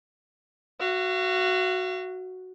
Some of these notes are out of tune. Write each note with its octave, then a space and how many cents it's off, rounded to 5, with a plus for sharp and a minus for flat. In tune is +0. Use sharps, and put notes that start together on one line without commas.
F#4 +0 F5 -45